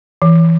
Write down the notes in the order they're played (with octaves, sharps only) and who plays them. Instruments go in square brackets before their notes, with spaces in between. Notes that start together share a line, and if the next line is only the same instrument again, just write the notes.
[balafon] E3